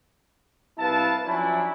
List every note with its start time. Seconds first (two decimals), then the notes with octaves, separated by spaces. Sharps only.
0.78 C2 E4 B4 F5 A5
1.25 F3 F#3 C#4 D4 E4